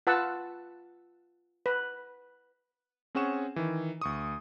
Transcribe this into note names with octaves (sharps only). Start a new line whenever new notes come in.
F4 B4 F#5 A5 E6
B4
C4 C#4 G#4 F#5 C#6 E7
D#3 E3
D2 C#6 D#6